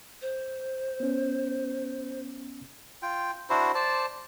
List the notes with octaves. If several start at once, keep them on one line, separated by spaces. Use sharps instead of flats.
C5
B3 C#4
F4 G5
D4 E4 F#4 C5
C5 D5 A5